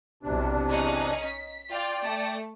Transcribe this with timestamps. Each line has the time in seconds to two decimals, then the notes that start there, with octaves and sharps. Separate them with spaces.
0.23 B1 E2 C3 D4
0.70 C#4 D#4 G#4
1.24 B6
1.71 F4 D5 G5
2.02 A3